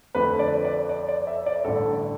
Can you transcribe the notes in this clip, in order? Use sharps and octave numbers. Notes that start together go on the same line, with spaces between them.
F2 D3 A3 B4
D5
D5
D5
D5
E5
D5
A1 G2 D3 A4